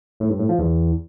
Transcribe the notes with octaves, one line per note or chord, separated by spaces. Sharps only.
A2
G2
A2
F3
E2